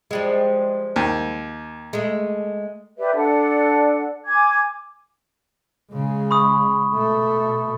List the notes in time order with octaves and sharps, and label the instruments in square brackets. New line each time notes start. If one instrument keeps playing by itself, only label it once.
[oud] F3 G3 G#3
[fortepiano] D#2
[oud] G#3 A3
[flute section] G4 B4 D5 E5
D4 A4 D5 F#5
G#5 D6 G#6
[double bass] C#3 G#3
[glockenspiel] B5 C#6 D#6
[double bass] B2 A3